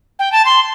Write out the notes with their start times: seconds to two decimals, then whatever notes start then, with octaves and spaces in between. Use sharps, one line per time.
0.19 G5
0.32 A5
0.45 C6